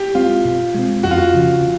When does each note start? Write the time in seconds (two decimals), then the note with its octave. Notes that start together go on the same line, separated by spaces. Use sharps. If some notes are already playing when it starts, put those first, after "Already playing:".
Already playing: G4
0.15 G#3 C4 F4
0.45 B2
0.74 G#3 C4
1.03 F2 F#4
1.11 F4
1.18 F#4
1.34 C#3 F3